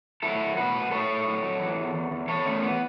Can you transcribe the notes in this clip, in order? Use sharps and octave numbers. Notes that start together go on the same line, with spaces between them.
F#3 E4 A4
F#3
A2 F#4 B4
F#3
A2 A4 C#5
A2
F#3
F#3
E3
E2
E2
E2
E2 A4 C#5
E2 A3 C#4
E3 B3